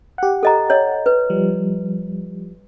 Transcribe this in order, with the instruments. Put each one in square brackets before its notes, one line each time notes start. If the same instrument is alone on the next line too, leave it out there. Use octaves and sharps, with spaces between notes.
[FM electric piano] G4 F#5
[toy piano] A4 D#5 A#5
C#5 D#5
B4
[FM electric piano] F3 G3